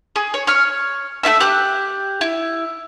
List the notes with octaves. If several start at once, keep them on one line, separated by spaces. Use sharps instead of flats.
G#4
C#5
C#5 F6
A3 F4 E5 E6
G4 F#6
E4